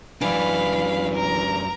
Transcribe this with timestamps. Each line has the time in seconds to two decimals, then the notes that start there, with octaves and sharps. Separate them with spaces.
0.21 F#2 E3 D4 F5 B5
1.14 A#4 A#5